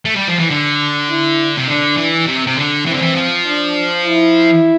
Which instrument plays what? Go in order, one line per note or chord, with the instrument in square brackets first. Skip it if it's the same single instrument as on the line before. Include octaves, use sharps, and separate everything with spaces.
[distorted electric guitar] A3
G3
F3
E3
[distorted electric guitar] D3 [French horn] D4
[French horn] E4
[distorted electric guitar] C3
[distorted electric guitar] D3 [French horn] D4
[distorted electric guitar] E3
C3
C3
D3
[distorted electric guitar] E3 [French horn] C4
[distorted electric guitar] D3
E3
F3
[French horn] D4
E4